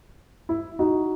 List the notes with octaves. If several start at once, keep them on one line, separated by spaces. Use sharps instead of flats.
E4
D#4 F#4